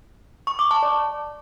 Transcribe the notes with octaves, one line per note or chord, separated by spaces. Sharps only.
C#6
D6
A5
D5